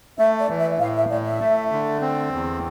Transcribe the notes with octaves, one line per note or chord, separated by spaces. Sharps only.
A3 E5
D5
E3
E5
A2 F5
E5
A2 D5
E5
A3
D3
C4
E2